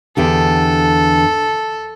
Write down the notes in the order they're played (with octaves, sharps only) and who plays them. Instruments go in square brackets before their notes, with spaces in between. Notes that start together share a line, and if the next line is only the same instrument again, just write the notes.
[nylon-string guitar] E2 D3 G4 [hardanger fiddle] A4